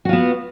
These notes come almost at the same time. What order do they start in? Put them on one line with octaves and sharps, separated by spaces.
F#4 F4 B3